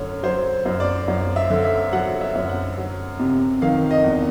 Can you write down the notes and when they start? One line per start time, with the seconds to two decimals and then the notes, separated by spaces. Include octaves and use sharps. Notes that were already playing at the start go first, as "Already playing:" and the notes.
Already playing: F#2 D3 C#5
0.23 F#3 C5
0.66 F#2
0.80 D5
1.08 F#2
1.36 E5
1.50 D3
1.65 E5
1.93 F#3 F#5
2.21 E5
2.35 F#2
2.49 F#5
2.78 F#3
3.19 C3
3.62 D#3 F5
3.91 D#5
4.04 E2